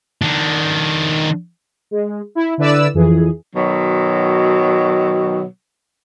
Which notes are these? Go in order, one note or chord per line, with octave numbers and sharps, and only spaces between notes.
D#3 D4
G#3
E4
D3 E4 B4 D5 E6
F2 E3 G#4
B2 D#3 F#3